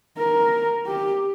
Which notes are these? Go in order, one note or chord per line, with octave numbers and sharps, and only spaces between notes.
A#4
G4